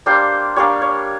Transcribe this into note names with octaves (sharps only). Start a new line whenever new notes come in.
G3 A#3 D4 C5
G3 A#3 D4 C#5
C#5